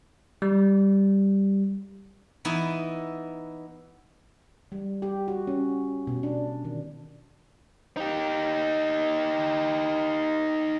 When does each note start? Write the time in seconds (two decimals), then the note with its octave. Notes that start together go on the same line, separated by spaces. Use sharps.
0.42 G3
2.45 E3 B3 D#4 E4
4.72 G3
5.02 G4
5.28 F#4
5.47 C#4
6.07 B2
6.23 D4
6.65 D#3
7.97 D#4 G4